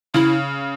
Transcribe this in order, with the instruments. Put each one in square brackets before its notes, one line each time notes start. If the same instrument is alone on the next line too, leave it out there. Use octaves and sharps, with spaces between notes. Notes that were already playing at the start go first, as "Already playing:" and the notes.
[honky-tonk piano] C#3 [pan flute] E4